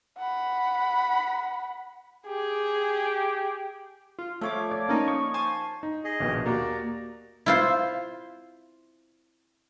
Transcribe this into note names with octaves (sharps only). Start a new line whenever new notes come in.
F#5 B5
G4 G#4
F4
F3 A3 C#5 D6
D5
A#3 C#4 D#4
C#6
C5 G#5 A5
D#4
G#4 D#5
A#1 D#2 B2
A#3 F#4 G4 D5 A#5
E4 F4 C5